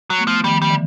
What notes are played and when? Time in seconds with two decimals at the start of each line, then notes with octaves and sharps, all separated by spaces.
0.10 F#3
0.18 A3 B3
0.27 F3
0.44 D#3 F3 G3
0.62 G3
0.70 D3 E3